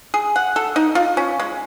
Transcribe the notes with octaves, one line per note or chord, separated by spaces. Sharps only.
G#4
F#5
A4
D#4
F4
C#4
G#3